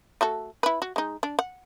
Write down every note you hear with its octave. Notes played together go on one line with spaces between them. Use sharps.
A3 F#4 A4
E4 B4
F#4
G#3 D#4
D4
F#5